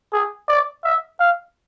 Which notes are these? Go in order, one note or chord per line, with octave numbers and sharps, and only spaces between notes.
G#4
D5
E5
F5